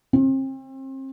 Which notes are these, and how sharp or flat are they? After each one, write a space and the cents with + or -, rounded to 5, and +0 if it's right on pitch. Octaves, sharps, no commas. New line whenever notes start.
C4 +35